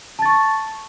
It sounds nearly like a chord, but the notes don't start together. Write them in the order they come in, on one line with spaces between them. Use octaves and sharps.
A5 A6 C#6